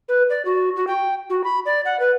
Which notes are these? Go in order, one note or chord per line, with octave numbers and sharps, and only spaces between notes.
B4
D5
F#4
F#4
G5
F#4
B5
D5
F#5
B4